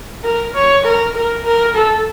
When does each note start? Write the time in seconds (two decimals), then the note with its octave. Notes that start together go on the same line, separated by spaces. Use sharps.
0.24 A#4
0.54 C#5
0.85 A#4
1.15 A#4
1.45 A#4
1.75 A4